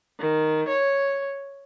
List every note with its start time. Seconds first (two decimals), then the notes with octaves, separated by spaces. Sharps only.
0.20 D#3
0.69 C#5